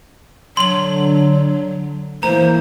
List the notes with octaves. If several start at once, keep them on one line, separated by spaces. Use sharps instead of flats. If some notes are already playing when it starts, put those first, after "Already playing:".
D3 F#3 C6 F#7
E3 A#3 C5 A#5